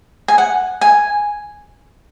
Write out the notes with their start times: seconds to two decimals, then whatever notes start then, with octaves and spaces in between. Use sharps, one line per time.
0.28 G#5
0.38 F#5
0.81 G#5